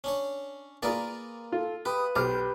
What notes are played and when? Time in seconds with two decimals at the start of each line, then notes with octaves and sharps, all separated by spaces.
0.04 C#4 D4 C#5
0.82 A#3 F4 G#4 A#4 B4 D5
1.52 F4 A4
1.85 G4 B4 D#6
2.16 B1 G4 C5 D6 F6